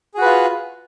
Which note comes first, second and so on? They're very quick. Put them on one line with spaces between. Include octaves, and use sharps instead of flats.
G#4 F#4 B4 F4